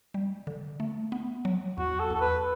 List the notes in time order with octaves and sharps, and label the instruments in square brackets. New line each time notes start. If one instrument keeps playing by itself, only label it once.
[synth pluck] G3
D3
A3
B3
F#3
[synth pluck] E2 [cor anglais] F#4
[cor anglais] A4
[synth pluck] E2 [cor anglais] A4
[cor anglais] B4